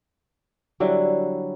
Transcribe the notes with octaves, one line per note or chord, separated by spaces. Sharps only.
D3 F#3 G3 E4